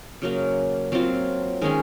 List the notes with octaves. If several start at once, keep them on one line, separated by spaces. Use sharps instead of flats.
C#3 F#3 A#3
F#3 C4 F4
D#3 G#3 C#4 G#4